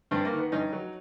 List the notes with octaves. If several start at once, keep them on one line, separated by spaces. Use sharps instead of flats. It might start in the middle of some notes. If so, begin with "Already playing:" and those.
G2 C4 D4
A#3
D#3
B3
G2 C#4 D#4
F#3